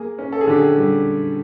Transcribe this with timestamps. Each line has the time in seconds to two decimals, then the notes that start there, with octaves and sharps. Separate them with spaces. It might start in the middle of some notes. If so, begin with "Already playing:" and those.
Already playing: A#3 G#4
0.18 C#4
0.32 A4
0.41 G#4
0.47 D3 G4
0.58 G#4
0.77 G3